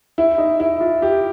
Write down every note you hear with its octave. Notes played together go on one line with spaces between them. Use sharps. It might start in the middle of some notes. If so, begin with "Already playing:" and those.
E4
D#4
E4
F4
G4